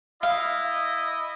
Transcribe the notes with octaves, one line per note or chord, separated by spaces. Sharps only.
E4 D#5 F5